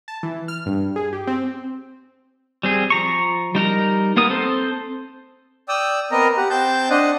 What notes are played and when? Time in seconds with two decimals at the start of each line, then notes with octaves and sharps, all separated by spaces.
0.08 A5
0.23 E3
0.48 F6
0.66 G2
0.96 G#4
1.13 G4
1.27 C4
2.63 G3 C4 G#4
2.90 F3 A#5 C#6
3.55 G3 D#4 A#4 A#5
4.16 A#3 B3 A#4 D#6
4.30 C4 A4 C5
5.69 D5 G5 D#6 E6
6.12 B3 C4 A#4 D#5 A#5
6.37 G4 F#5
6.50 C4 C5 G5 A5 G6
6.90 D4 C5 D#5 F#5